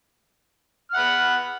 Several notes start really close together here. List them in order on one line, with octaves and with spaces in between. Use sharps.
F6 F#5 B5